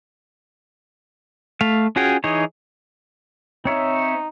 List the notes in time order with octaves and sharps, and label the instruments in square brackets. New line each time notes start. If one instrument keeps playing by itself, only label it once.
[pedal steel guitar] A3 F5
C#4 F4 F#4 G#4 G5
E3 D#4 G#4 C#5
[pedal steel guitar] C4 C#5 E5 [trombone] D#4